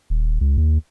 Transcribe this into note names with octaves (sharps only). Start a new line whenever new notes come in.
D#1
C#2
D#2